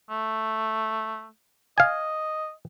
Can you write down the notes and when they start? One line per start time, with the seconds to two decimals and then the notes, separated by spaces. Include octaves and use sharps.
0.10 A3
1.78 D#5 F5 G#5